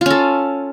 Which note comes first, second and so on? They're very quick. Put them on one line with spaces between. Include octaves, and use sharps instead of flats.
F4 C#4 A4